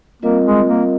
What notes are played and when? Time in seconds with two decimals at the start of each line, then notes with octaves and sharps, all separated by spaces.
0.22 G3 A#3 C4 F4 A#4 D#5
0.45 G#3
0.68 A#3